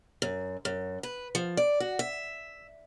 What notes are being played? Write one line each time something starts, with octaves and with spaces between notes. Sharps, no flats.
F#2
F#2
B4
F3
D5
F#4
E5